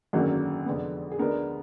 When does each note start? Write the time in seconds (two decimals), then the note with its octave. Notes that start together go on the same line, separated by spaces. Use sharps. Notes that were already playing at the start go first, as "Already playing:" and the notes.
0.13 G#1 F#2 D3 F#3 A#3 G#4
0.66 F1 F2 D3 G#3 B3
1.12 G#4
1.19 D2 D3 G#3 B3 D4 A#4